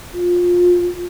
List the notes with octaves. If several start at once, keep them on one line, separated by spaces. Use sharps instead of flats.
F4